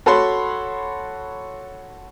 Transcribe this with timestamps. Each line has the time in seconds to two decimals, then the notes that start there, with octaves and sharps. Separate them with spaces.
0.06 F#4 A4 C#5 B5 C6